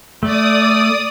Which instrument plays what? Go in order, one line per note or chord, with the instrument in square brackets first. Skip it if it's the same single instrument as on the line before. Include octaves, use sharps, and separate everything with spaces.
[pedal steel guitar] A3 [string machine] D5 D#6